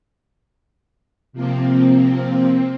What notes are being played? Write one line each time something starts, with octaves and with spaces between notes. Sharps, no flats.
C3 F3 A#3 C4